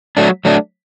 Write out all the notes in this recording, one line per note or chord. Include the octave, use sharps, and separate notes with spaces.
F#3 A3 D4
F#3 A3 D4